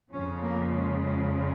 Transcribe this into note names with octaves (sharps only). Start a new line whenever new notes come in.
F2 C#3 F3 C#4
A#3
G#3
G#3